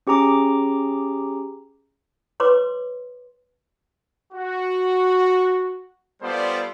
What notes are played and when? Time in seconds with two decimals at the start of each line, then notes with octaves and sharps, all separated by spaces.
0.07 C#4 G4 G#4 A#5 D6
2.40 B4 C#5 C6 D6
4.33 F#4
6.22 G3 B3 F4 A4 C5 D5